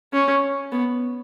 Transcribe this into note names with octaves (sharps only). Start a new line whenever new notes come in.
C#4
B3